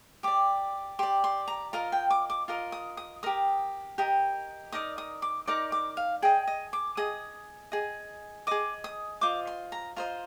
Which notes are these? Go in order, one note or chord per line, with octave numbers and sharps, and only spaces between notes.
G4 D5 D6
G4 D5 C6
C6
A#5
F4 A#4 D#5 A#5
G5
D6
D6
F4 A#4 D#5
D#6
D#6
G4 A#4 D#5 D#6
G4 A#4 D#5
D#4 A#4 D5 D#6
D#6
D6
D#4 A#4 D5 D6
D6
F5
G#4 D#5 G5
D#5
D6
G#4 D#5 D#6
G#4 D#5
G#4 D#5 D6
D#6
F4 C5 D#5 D6
C6
A#5
F4 C5 D#5 A#5